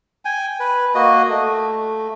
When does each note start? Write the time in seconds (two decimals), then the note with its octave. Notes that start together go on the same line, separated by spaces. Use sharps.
0.25 G5 G#5
0.60 B4
0.95 A#3 F#4 D#5
1.29 A3